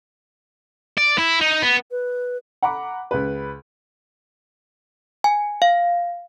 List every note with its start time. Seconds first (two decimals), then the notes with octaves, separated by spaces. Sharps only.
0.97 D5
1.18 E4
1.41 D#4
1.62 B3
1.91 B4
2.62 F#5 A#5 B5 D6
3.11 C#2 B4
5.24 G#5
5.62 F5